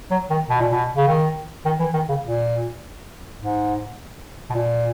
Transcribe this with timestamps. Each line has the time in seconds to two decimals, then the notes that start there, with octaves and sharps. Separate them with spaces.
0.11 F#3
0.30 D#3
0.50 B2
0.60 A#2
0.72 B2
0.97 C#3
1.08 D#3
1.65 D#3
1.80 E3
1.94 D#3
2.09 C#3
2.23 A#2
3.40 G#2
4.50 B2
4.54 A#2